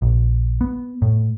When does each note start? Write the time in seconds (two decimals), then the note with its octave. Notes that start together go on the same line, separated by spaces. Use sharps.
0.02 A#1
0.61 B3
1.02 A2